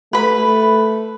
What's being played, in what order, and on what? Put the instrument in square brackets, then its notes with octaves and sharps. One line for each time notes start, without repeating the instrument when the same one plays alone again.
[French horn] A3 [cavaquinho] B4 B5